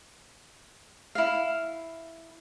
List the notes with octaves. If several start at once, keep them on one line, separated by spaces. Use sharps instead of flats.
E4 F5